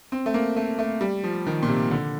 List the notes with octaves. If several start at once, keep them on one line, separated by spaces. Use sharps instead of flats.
C4
A3
A#3
A3
A3
G3
F3
D#3
A#2
C3
D3